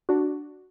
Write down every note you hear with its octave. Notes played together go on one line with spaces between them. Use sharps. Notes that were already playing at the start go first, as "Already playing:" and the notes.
D4 F#4